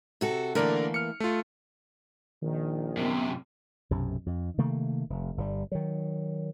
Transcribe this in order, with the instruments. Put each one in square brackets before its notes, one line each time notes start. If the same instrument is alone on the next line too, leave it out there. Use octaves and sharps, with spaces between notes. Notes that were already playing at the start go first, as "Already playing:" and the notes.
[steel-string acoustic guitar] C3 F#4 A4
[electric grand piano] D3 A#4 D5 [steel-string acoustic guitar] E3 A3 A#3
[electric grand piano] F6 C#7
A3 F4
[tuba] A#1 [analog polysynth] D#3
[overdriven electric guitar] F#2 C3 [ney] B3
[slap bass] B1 F#2 C3
F2
C3 D#3 A3 A#3
F1
G1 D3 G3
D#3 F#3